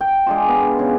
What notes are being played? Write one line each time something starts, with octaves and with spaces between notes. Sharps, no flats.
G5
G#3 D4 F4
B3
C#3